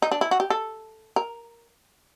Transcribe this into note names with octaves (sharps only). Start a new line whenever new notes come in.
D#4
D4
E4
F#4
G4
A4
A#4